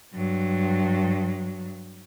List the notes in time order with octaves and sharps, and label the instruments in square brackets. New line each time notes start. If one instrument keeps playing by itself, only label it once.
[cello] G2 F#3